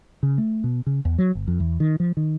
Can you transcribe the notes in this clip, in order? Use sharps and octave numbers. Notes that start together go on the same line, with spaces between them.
C#3
A3
B2
C#3
E2
F#3
G1
F2
E2
D#3
F3
D#3